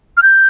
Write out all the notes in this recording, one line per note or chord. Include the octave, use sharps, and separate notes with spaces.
F6
G6